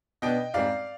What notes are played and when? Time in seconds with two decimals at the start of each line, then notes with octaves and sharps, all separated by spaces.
0.22 B2 B3 D4 D#5 G5
0.54 G#2 G3 C4 D5 F5